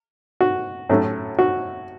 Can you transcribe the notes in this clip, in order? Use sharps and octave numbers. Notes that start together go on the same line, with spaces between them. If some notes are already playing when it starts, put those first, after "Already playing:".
F#4
A2 F#3 A3 C#4
F#4